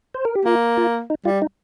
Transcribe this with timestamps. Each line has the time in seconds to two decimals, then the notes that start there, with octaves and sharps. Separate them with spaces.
0.14 C5
0.25 A#4
0.35 G4
0.45 A#3 F4
0.77 F4
1.10 D#4
1.25 G3 F4
1.42 D#4